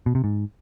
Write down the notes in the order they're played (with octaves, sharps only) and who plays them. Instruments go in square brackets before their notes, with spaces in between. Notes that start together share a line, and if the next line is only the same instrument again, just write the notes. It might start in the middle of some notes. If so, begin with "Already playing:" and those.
[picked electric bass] B2
C3
G#2